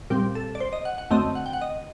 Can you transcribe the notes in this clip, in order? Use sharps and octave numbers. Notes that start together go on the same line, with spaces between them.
A#2 G3 C4 G4
A4
D5
C5
D#5
F#5
F#5
F#2 D3 A3 C4 D#5
F#5
G5
F#5
D#5